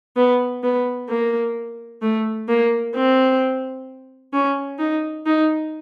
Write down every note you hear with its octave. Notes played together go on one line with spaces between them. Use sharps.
B3
B3
A#3
A3
A#3
C4
C#4
D#4
D#4